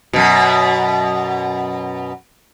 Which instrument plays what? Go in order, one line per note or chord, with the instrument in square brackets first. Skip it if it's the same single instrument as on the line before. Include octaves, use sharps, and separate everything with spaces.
[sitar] F#2 B2